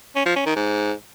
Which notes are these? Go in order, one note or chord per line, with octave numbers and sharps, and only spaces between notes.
C#4
F3
C#4
D#3
G#2